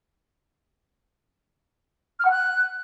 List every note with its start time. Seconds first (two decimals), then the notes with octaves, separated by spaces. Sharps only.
2.20 F6
2.25 F#5
2.31 F#6